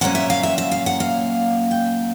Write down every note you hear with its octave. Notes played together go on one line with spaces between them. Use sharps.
A#2 F#3 A#3 C#4 F#5
E5
F5
E5
E5
F5
F#5
F5
G5